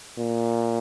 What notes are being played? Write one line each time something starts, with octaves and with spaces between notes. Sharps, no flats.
A#2